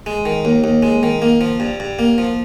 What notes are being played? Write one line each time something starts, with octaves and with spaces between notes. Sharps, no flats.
G#3
D#3
D#2
D#2
G#3
D#3
A#3
F3
G2
G2
A#3
F3